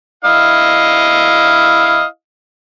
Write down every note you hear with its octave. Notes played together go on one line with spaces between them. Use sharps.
E4 D#5 F5